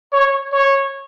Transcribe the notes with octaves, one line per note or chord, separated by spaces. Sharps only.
C#5
C#5